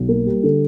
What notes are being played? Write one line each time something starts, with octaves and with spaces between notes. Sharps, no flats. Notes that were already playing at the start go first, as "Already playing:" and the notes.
Already playing: B1
A#3
G3
D3